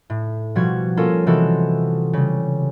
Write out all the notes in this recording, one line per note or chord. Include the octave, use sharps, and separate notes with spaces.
A2
B2 F3 G3 F#4 G#6
A#3 C#4 F4 A4 A#4
C3 E3 G#3 C4 F#4 A4
C#3 G3